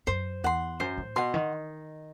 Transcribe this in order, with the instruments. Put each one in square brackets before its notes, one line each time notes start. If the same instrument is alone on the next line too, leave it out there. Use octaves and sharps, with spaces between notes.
[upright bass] F#2 [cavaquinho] C5
[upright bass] E2 [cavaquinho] F#5 C6
[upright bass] F#2 [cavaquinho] C5
[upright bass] A2
[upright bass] B2 [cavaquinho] F#5 C6
[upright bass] D#3